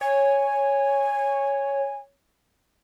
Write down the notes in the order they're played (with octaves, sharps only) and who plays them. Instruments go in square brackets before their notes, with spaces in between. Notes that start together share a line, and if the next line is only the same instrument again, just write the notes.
[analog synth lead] C#5 [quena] G#5